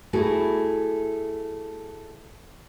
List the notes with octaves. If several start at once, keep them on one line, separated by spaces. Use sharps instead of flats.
A3 E4 F#4 G#4